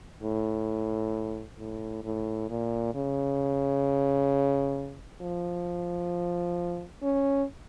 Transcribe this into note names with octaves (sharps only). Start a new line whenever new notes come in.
A2
A2
A2
A#2
C#3
F3
C#4